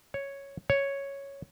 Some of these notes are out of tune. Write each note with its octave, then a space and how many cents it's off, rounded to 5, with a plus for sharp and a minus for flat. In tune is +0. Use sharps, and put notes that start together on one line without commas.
C#5 +0
C#5 +0